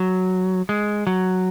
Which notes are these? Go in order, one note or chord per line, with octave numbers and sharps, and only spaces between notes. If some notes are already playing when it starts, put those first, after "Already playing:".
Already playing: F#3
G#3
F#3